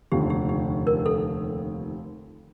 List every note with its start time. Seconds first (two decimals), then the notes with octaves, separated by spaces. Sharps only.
0.12 F1 D#2 D3 F3 G4
0.30 G4
0.49 G4
0.87 A#4
1.06 A4